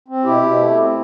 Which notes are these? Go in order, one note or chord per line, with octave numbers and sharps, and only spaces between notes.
C4
B2 E4 G4
B2
A3
C4